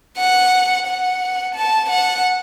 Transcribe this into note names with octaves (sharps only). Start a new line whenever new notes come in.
F#5
F#5
A5
F#5